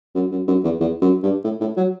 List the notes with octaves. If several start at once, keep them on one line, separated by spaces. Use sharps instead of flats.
F#2
F#2
F#2
E2
E2
F#2
G2
A2
A2
F#3